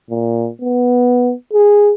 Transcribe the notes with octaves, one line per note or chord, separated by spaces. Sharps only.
A#2
B3
G#4